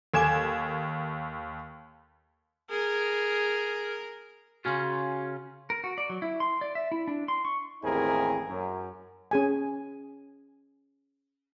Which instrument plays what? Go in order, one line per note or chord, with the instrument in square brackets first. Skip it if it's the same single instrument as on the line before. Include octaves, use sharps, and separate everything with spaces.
[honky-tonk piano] D#2 G#6 E7 [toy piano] A4 G#5 D6
[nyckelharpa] G#4 [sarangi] A#4
[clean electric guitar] C#3 C#4 F4 [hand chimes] F#4 C6
[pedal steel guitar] A#4
F#4
D5
F#3
E4
C6
D5
E5
E4
D4
C6
C#6
[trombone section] A1 D#2 C4 E4 G#4 A#4
F#2
[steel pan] C#4 G#4 G#5